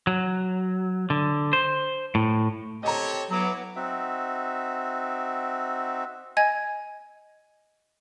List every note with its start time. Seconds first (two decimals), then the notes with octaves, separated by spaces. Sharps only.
0.07 F#3
1.10 D3
1.53 C5
2.15 A2
2.83 C4 G4 A4 C#5 D#5 A#5
3.30 F#3 B3 E4 F#4 C#5 D6
3.76 C4 D#4 F#4 E5
6.37 D#5 G#5 G#6